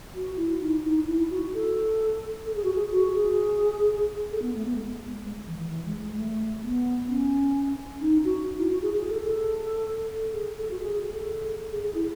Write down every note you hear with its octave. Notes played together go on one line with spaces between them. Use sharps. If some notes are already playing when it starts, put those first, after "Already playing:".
F#4
E4
D#4
D#4
E4
F#4
A4
A4
G#4
F#4
G#4
F#4
G#4
A4
B3
A3
B3
G#3
G#3
E3
E3
E3
G#3
G#3
A3
B3
C#4
D#4
F#4
E4
F#4
G#4
G#4
A4
A4
G#4
A4
F#4
G#4
G#4
A4
G#4
G#4
E4